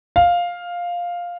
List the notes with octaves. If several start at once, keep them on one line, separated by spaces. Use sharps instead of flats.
F5